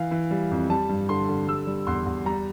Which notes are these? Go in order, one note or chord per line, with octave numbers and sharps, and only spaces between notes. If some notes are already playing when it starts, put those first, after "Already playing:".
Already playing: E3 F5
E3
G3
F2
G3 A5
G2
D3 C6
D3
G3 E6
G3
E2 C6
E2
G3 A#5